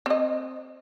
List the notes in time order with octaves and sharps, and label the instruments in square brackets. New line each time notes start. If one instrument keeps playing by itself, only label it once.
[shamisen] C4 D#5